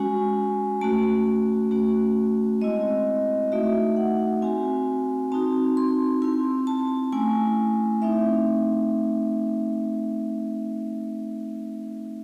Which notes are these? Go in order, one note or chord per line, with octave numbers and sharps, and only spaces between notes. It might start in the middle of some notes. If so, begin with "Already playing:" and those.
Already playing: G#3 C#4 F#4 G#5
A3 C#4 F#4 A5
A3 C#4 F#4
G#3 C4 E4 D#5
A3 D#4 F#4 E5
F#5
C4 F#4 G#5
C4 D#4 F#4 A5
C6
C4 E4 C6
A5
A3 C#4 E4 G#5
A3 C4 D#4 E5